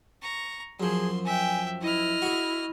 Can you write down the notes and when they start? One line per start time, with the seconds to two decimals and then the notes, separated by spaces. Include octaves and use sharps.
0.22 A#5 C#6
0.80 F#2 F3 G#4 C6
1.25 E5 G5 G#5
1.82 E4 D#5 F6
2.22 F#4 G#4